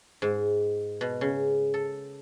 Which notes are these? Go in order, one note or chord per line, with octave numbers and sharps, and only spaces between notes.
G#2
B2
C#3
A4